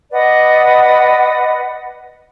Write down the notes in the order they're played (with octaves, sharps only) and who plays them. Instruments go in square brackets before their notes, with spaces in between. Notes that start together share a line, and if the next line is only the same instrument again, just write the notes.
[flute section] B4 D5 D#5 F#5